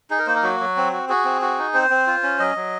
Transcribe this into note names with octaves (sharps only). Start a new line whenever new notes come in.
D#4 G#4
A#4
A#3 C5
A#4
F#3 F#4
F#3
C4
F#4
F#4 G#4
C4
F#4
D#4
C4 C5
C4
F4
C#4
F#3 D#5
F#3